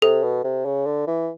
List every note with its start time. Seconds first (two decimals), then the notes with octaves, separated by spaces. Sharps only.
0.02 C3 A4
0.23 B2
0.44 C3
0.65 C#3
0.86 D3
1.07 E3